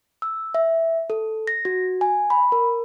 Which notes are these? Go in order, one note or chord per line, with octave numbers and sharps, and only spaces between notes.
E6
E5
A4
A#6
F#4
G#5
B5
A#4